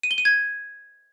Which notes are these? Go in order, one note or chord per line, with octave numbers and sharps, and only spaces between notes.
D#7
G7
D#7
G#6